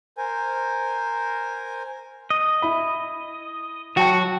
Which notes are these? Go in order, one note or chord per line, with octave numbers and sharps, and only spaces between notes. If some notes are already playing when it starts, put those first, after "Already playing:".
A#4 C5 G#5
D#5
E4 B5
F#3 F#4 G5 A5 C#7